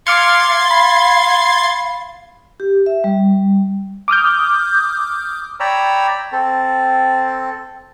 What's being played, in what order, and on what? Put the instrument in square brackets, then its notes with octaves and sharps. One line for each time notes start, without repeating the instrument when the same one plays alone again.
[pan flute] F5 [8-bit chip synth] C6 G#6 A6 [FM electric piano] D6 F6 C#7
[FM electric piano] B5
[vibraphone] G4
E5
G3
[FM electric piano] D6 D#6 F6 G6
[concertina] C#5 D5 G5 A#5 B5 E6
C4 A4